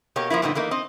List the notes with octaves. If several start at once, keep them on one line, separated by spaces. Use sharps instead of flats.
B2 A#3 G4 C#5
F3 G3 A#3 E4
G2 A#2 D3 B3 C#4 D#4
E3 A3 A#3 D#4
C4 D#5